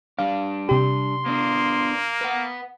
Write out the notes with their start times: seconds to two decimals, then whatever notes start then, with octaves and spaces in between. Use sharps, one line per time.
0.19 G3 D4 F5
0.69 C3 G4 C6
1.26 A#3 B3 D4
2.21 B4 F#5